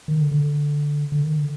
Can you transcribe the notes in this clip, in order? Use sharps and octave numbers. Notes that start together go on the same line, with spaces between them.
D#3
D3
D3
D3
D#3
D3